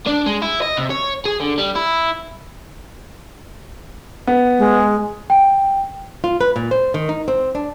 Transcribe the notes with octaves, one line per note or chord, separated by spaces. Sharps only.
D4
G#3
E4
D#5
C3
C#5
G#4
D3
G3
E4
B3
G#3
G5
F4
B4
A#2
C5
D#3
D#4
C4
D4